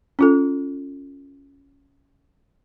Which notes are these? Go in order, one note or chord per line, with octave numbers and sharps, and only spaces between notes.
C#4 F4 A4